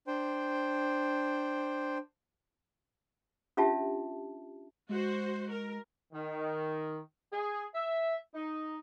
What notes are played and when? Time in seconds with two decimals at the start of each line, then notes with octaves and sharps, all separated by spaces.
0.07 D4 C5 G5
3.57 C#4 D4 F4 G4 E5 A5
4.89 G#3 F#4 C5
5.50 A#4
6.13 D#3
7.32 G#4
7.75 E5
8.34 D#4